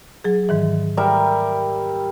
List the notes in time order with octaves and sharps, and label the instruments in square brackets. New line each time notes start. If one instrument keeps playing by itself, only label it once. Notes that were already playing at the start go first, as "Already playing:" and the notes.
[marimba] F#3 G#4
G#2 D#3 E3
[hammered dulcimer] G3 A#4 E5